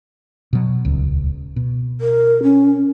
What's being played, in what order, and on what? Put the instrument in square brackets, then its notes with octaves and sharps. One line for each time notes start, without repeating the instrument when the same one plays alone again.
[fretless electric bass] B2 F#3
D#1 C#2
B2
[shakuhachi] A#4
C#4